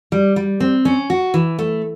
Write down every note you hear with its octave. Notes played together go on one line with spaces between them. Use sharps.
G3
G3
C4
C#4
F#4
E3
A3